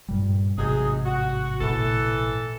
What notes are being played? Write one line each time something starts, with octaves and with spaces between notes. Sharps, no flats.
G2 A#2 G3
A1 G#2 C3 F#3 D#4 G#4
F#4
A#2 E3 A4